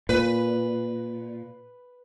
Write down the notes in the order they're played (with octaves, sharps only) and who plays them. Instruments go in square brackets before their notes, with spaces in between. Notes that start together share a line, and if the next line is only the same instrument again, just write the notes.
[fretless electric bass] A#2 [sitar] B4